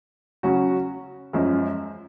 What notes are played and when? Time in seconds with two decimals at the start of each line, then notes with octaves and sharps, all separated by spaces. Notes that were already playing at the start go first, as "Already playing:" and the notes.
0.43 C#3 F#3 C#4 F#4
1.33 F#2 F3 G#3 C#4